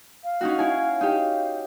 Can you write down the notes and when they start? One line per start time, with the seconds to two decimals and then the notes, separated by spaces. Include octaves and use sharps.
0.24 F5
0.41 C#4 D#4 F#4
0.58 E4 G#5
1.01 D#4 G4